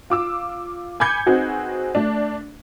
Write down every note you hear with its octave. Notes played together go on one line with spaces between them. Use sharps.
F4 D6 E6
G#5 B5 D6 G6 G#6 C#7
C4 D#4 F#4 G#4 B4
A3 D4